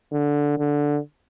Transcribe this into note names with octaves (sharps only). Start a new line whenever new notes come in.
D3
D3